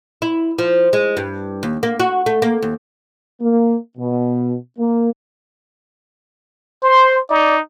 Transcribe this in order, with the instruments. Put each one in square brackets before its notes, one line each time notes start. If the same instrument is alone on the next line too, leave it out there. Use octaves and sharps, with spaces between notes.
[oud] E4
F3
G#3
G2
D#2
A#3
F#4
A3
A#3
D#2
[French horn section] A#3
B2
A#3
[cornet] C5 [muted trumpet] C6
[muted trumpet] D#4 [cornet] D5